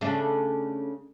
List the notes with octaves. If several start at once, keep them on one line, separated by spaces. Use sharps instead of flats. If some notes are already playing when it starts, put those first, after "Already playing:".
C#3 A3 D4